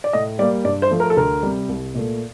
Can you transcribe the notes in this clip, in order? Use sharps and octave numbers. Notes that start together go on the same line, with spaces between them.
D5
A2 D#5
G3 A#3 D5
G2 D5
C5
F3 A3
A#4
A4
D2 A#4
C3 G3
C2
A#2 A3